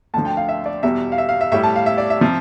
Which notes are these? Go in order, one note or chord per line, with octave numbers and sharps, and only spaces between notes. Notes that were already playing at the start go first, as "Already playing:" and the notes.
D2 D3 F3 A5
G5
F5
E5
D5
E2 B2 G3 E5
F5
E5
F5
E5
A2 G3 E5
A5
F5
E5
D5
E5
C3 F3